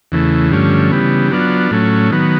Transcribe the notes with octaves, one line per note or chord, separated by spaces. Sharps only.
E2 C#3 E3 A3
G2 D3 F3 A3 C#4
C#3 E3 G3 B3
F#3 B3 D4 F4
A2 F#3 A3 C#4
D#3 F#3 B3